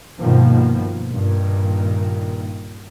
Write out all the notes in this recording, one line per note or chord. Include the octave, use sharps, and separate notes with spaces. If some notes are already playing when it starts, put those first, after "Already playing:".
G2 B2 D#3 F3 A#3 B3
G2 A#2 D#3